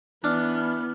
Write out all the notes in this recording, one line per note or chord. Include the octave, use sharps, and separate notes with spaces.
E3 B3 D4 F6